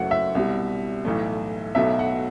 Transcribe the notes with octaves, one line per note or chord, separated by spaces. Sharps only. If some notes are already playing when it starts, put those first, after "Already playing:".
Already playing: F#1 F#2 F#3 A3 F#5
E5
C2 B2 G3
B1 A2 E3 A3
B1 B2 F#3 A3 E5
F#5